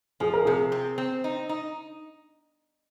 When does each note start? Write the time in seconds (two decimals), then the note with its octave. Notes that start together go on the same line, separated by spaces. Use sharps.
0.20 F3 G#4
0.33 A#4
0.45 C3 G#4
0.72 C4
0.98 C4
1.24 D#4
1.49 D#4